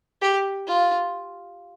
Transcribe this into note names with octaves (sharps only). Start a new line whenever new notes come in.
G4
F4